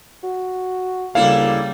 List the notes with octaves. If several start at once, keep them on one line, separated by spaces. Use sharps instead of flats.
F#4
D2 C#3 G3 A#3 D4 E4 A4 F5